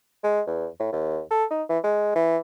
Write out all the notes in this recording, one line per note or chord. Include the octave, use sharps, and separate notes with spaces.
G#3
E2
A2
D#2
A4
D#4
E3
G#3
E3